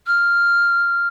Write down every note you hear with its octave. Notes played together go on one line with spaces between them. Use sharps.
F6